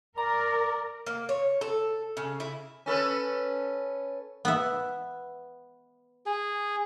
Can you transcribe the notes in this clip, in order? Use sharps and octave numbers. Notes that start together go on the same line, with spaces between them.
A#4 D5 A#5
A#3
C#5
A4
C#3
E4
C#4 A4 B4
B3 E5
G#4